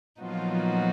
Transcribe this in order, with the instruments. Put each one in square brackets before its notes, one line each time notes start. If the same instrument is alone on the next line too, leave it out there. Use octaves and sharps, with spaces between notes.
[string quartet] A#2 F#3 B3 D#4 F#4 [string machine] F3 F4